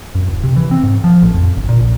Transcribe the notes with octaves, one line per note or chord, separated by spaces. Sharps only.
F#2
D1
C3
E3
C4
G#2
F3
A1
F2
G1
A#2
A#1